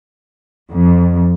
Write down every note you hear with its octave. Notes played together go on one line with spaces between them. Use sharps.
F2